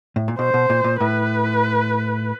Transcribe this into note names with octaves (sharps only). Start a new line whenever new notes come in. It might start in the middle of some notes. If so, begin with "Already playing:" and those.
A2
A#2
B2 C5
B2
A#2
A#2
A2 B4